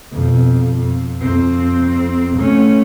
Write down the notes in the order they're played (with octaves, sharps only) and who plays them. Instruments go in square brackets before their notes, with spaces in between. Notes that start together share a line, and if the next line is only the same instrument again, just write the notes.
[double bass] F2 B2
F2
F2 C4
A3 C#4